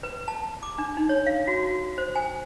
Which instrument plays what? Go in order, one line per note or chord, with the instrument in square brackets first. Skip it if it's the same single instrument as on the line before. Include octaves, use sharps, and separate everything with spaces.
[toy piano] B4
A5
D6
D4
D#4
C#5
F5
F#4
F#4
C5
G#5